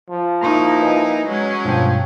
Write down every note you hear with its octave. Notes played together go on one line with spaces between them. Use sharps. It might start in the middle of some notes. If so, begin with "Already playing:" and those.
F3
A#3 D#4 E4 A#5 C6 C#6
B4 D#5 G#5
F#3 G#3 C#4
G2 B2 F3 G5